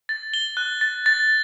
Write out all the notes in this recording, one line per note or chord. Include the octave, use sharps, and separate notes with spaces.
A6
G7
F#6
A6
A6